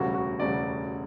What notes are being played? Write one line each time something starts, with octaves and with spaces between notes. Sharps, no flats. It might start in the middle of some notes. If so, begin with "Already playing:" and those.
Already playing: E1 D2 C#3 G3 F#4
F#4
E1 D2 C#3 G3 D5